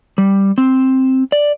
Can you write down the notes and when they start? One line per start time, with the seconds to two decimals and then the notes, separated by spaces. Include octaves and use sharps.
0.18 G3
0.58 C4
1.32 D5